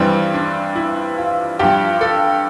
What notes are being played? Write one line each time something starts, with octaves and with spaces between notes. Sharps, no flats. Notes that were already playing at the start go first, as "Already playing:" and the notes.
Already playing: G2 E3 G3 C4
D4
E4
F4
G2 F3 G4
A4